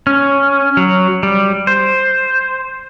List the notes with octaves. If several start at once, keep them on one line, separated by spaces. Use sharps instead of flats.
C#4
F#3
G3
C5